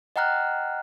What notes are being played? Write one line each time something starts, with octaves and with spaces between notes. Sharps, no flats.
D#5 F#5 G5 A#5 F6 F#6